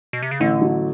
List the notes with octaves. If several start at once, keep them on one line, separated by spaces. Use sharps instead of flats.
B2
C3
C#3
A1 D3
F#3